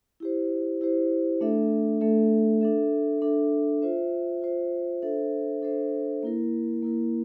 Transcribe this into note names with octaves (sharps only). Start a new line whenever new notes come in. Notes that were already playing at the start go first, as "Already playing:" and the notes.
E4 G4 C5
E4 G4 C5
A3 D4 A4 E5
A3 D4 A4 E5
D4 A4 E5
D4 A4 E5
F4 C5 E5
F4 C5 E5
D4 A4 C5 E5
D4 A4 C5 E5
A#3 E4 A#4
A#3 E4 A#4